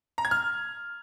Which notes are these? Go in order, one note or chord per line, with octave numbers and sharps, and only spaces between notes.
A#5
G#6
F6